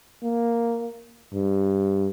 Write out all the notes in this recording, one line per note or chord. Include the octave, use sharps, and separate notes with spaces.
A#3
G2